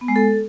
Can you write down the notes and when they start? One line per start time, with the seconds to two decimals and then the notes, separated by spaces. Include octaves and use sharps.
0.01 B3
0.08 G#3
0.16 A4